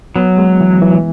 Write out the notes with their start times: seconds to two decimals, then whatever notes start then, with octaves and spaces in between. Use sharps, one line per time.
0.16 F#3 B3
0.38 G#3
0.61 E3
0.82 E3